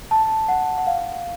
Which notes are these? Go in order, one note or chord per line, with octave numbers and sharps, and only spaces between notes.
A5
F#5
F#5
F5